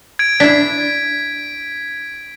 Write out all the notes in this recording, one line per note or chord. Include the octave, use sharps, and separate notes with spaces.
G#6 D7
D4 E4 B6